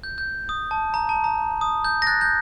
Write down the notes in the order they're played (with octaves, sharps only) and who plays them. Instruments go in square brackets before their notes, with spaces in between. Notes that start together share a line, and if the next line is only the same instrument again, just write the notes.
[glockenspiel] G6
G6
D#6
A5
A#5
A5
A#5
D#6
G6
A#6
F#6 A6
G6